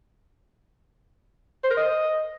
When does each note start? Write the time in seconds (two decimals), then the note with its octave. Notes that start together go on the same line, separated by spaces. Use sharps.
1.64 C5
1.71 A#4
1.77 D#5